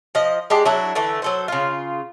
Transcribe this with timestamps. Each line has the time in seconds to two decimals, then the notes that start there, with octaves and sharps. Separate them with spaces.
0.15 F3 D#5
0.50 G#3 D4 G4
0.65 F#3 D4 E4 F#4
0.95 D3 E3 A3
1.22 F#3 A4 C5
1.48 C#3 F4